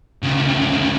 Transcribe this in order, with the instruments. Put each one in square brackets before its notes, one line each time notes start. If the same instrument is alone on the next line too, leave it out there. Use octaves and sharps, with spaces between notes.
[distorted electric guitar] D2 C#3